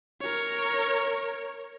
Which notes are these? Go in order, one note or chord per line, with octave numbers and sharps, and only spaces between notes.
A#4 C#5